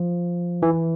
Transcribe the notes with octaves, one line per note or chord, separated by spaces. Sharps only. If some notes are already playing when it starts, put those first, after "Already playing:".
Already playing: F3
E3